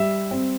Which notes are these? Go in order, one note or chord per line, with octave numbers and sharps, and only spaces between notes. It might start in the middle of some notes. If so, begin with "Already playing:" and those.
Already playing: G3 E5
C4